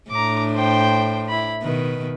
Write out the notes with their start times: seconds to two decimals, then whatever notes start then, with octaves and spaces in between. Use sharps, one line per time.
0.11 A2 D4 A#5 D6
0.56 C5 G5
1.29 E4 B5
1.63 B2 D#3 B4